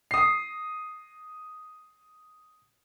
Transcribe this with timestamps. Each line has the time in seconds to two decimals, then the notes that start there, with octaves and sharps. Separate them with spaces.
0.11 D#6 C7